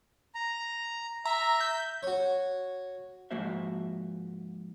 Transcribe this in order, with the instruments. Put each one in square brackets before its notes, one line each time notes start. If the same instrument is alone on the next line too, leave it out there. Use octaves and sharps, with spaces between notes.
[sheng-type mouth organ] A#5
[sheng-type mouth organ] E5 [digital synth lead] A#5
[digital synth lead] G6
[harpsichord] F#4 C#5
[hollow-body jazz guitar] G#2 F3 A#3 F#4 C5 E5